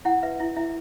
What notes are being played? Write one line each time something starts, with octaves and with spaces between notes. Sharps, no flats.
E4 F#5
B4 E5
E4 E5
E4 E5